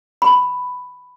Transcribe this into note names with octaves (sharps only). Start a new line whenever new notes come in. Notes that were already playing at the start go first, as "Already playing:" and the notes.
B5